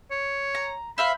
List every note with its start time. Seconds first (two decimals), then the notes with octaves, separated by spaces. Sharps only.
0.11 C#5
0.55 A#5
0.98 C5 E5 F5 B5